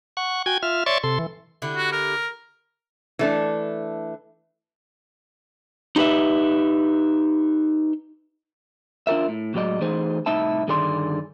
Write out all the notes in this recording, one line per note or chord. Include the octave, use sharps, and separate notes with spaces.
F#5 C#6
F#4 G5 G#5 G#6
F4 E5 F6
C#5 D5 E5 C6 C#6 A6
C3 A4 C6
E3
D3 E4 G4
F#4
A#4
E3 A3 D4
D#4 G4 B4 E5
D4 F4 A#4 E5
A2
A2 F#3 G#3 D5 D#5
E3 A3 D#4 G#4 C5
C2 A2 D#4 E4 E5 A5
G2 D3 D#3 G#4 D5 C6